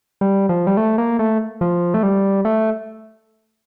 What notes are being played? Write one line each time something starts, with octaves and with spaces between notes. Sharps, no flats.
G3
F3
G3
A3
A#3
A3
F3
A3
G3
A3